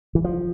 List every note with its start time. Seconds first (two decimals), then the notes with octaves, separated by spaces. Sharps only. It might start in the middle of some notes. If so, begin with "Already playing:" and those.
0.15 E3
0.24 F3